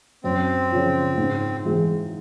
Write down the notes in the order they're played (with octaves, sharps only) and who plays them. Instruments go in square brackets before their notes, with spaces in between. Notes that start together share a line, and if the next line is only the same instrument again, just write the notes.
[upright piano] F#2 [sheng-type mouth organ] C4
[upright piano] C#3 F3
G#2
E3 G#3